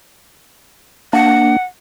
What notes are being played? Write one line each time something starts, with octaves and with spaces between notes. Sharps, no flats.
A#3 D4 F#5